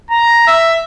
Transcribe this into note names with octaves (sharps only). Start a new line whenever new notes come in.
A#5
E5